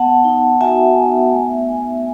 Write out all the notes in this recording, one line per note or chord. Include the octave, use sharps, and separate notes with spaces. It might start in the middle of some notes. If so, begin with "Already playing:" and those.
Already playing: B3 F#5 A5
D#4
F#4 E5 G#5
B3
A3
D#4